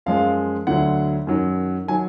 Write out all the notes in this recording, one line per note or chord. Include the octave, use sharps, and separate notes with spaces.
F#2 F3 G#3 F5
D2 D3 F#3 F#5
F#2 D#3 F#3
D#3 F#3 G#5